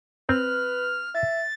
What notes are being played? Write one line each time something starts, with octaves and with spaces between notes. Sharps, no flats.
C4 B4 F6
E5 A6